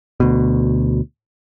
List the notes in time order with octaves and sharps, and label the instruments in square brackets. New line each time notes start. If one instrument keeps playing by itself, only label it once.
[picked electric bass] D2 B2